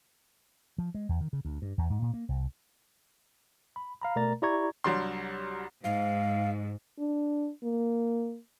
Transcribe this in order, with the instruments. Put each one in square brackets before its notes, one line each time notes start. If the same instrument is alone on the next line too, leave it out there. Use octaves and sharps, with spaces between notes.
[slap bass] F3
G#3
E2
D#3
C#3
D2
G2
E2
G#2
A#2
A#3
C2
[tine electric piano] B5
F5 A#5 B5
B2 A3 A#4 D5 A#5 A6
E4 G4 D5 A#5 C#6 G#6
[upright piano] C2 F#3 G3 D4 C6
[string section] G#2 [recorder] F5
[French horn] D4
A#3